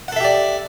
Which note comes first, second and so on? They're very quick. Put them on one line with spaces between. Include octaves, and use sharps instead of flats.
F#5 A4 E5 G4 D5